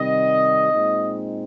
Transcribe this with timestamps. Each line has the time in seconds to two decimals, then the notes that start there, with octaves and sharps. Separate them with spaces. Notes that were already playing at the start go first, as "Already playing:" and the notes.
Already playing: C3 D#3 G3 D#5
0.71 A#2 G#3 C4 D#4